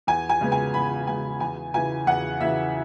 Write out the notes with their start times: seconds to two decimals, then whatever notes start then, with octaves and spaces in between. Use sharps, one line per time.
0.07 E2 G#5
0.29 G#5
0.41 C#3 G#3 B3
0.52 G#5
0.74 E2 B5
1.07 C#3 G#3 B3 G#5
1.40 E2 G#5
1.74 C#3 E3 G#5
2.07 E2 F#5
2.40 C#3 E3 E5